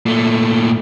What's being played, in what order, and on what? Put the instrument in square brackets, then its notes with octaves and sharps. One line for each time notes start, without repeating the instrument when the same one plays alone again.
[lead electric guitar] A#2 A3